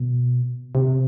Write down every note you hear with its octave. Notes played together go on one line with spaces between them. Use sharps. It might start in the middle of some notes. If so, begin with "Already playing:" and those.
Already playing: B2
C3